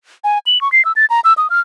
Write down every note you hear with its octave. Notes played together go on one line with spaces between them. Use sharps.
G#5
F#7
C#6
C7
E6
A6
A#5
E6
D#6
F6